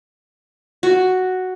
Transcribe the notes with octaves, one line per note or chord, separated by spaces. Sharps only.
F#4